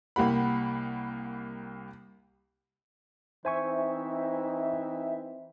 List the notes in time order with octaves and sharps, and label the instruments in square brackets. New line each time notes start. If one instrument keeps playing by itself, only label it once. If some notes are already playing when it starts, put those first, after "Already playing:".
[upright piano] C2 A#3 G4 F#5 B5
[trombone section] E3 C4 D#4 [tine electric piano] C5 G#5 C#6 [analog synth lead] E5